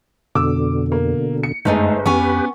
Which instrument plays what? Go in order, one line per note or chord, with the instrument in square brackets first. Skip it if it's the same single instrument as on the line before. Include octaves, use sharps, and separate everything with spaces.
[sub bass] F2 [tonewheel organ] B2 D3 [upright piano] D6 E6
[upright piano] A#3
C#7
[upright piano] G1 G#4 [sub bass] F#2 [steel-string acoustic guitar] G#3 A3 D#4 [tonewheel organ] C5
[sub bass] F2 [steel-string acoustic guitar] B3 C#4 G#5 [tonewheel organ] G4 B4 [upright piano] C#6